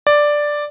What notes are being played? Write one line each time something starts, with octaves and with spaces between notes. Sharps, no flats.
D5